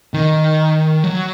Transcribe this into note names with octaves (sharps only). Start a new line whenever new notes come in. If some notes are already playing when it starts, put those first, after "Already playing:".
D#3
F#3